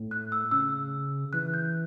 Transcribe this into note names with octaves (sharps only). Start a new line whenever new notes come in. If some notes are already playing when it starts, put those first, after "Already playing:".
Already playing: A2
F#6
E6
C#3 E6
E3 F#6
G6